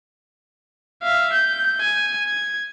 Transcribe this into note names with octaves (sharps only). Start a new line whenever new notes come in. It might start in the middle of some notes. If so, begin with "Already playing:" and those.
E5 F5
G6
G#5
G#6